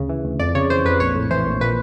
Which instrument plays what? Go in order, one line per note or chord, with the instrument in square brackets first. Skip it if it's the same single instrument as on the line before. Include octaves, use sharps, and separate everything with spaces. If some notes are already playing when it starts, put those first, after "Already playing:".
Already playing: [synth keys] D2 C#3
E3
D2
F2 D5
C#3 C#5
E3 C5
F2 B4
A#1 C#5
A2
E3 C5
A#1
A#2 B4